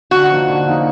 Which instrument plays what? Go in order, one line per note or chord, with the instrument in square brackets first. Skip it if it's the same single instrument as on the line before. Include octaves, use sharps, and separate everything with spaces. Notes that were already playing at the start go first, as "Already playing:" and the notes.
[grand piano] D3 [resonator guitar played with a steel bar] F#4
[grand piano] F3 A#3 D#4
D3
F3 A#3 D#4